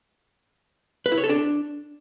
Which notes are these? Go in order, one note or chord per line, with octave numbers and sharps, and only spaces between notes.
B4
E4
C#5
A4
D4